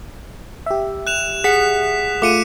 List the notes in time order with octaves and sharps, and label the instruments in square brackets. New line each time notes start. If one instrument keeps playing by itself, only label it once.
[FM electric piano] G4 E5
[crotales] F#6 E7 F7
[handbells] G#4 F#5 [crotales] B6
[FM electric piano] A3 F4 [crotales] D6 C#7 D#7